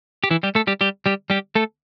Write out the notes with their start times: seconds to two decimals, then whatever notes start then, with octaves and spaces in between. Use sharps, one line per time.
0.24 G4
0.31 E3 E4
0.43 G3 G4
0.55 A3 A4
0.67 G3 G4
0.81 G3 G4
1.06 G3 G4
1.30 G3 G4
1.55 A3 A4